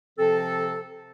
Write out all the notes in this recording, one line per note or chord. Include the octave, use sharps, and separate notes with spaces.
C3 F3 C4 A4